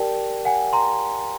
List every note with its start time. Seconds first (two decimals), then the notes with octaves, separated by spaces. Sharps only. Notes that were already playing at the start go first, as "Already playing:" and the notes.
Already playing: G4 A#4 D5 G5 A5
0.45 F#5 G#5
0.73 A#5 C6